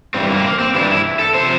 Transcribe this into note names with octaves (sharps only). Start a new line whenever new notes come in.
G2 E3 G3 C4
A#3
C4
A#3
C4
G2 E3 G3 E4
D4
E4
A4
C3 F3 C5